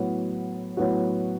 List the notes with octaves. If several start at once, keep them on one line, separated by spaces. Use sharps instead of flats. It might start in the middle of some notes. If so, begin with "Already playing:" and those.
Already playing: A2 F#3 B3 F#4
A2 F#3 B3 F#4